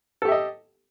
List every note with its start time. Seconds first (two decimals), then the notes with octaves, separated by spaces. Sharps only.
0.22 A4
0.25 G4
0.28 E5
0.32 D#5